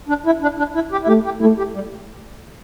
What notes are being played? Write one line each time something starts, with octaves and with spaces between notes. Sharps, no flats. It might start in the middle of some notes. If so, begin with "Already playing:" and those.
D4
E4
D4
D4
E4
G4
E4
A3 G4
G4
A3 E4
G4
G3